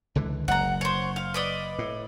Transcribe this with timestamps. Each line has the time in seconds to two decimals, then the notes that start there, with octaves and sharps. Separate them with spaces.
0.15 C#2 D3 E3
0.48 F#1 F#5 A#5
0.81 C5 C#5
1.16 F5
1.34 B4 D5 D#5
1.79 A2